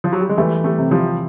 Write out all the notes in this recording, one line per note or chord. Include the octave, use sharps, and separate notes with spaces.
F3
F#3
G3
G#3
E3 G3 A3
G3 A3
C3
F3 G3